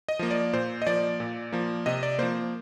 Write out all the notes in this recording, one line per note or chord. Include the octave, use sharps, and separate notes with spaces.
D#5
F3 A#3
D5
A#2 C5
D#5
F3 A#3 D5
A#2
F3 A#3
C3 D#5
D5
F3 A#3 C5